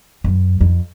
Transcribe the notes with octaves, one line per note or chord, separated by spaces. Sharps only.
F#2
F2